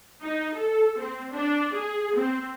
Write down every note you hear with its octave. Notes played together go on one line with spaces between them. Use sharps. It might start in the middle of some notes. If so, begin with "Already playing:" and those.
D#4
A4
C4
D4
G#4
C4